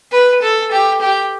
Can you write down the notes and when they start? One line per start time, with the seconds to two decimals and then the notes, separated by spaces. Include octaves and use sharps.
0.12 B4
0.42 A4
0.71 G4
1.01 G4